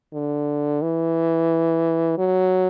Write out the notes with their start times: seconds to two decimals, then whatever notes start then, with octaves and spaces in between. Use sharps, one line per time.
0.14 D3
0.82 E3
2.18 F#3